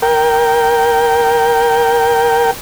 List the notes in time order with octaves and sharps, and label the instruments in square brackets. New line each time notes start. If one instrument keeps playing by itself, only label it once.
[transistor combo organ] A#4 G5